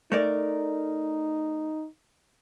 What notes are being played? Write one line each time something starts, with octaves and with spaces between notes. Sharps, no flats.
A3 D#4 A#4 D5